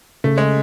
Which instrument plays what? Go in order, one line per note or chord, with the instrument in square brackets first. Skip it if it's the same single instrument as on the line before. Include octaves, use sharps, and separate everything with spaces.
[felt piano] C#3 [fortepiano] A3
[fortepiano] G#3